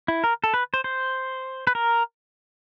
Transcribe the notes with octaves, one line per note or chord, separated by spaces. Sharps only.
E4
A#4
A4
B4
C5
C5
B4
A#4